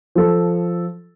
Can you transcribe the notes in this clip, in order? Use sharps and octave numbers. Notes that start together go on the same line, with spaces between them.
F3 A4